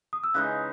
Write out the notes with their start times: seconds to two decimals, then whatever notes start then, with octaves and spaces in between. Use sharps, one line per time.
0.13 D#6
0.24 E6
0.34 C#3 E3 G#3 D#4 F#6